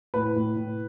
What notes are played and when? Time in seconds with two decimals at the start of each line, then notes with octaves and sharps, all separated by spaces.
0.14 A2 B4
0.36 A2
0.56 A2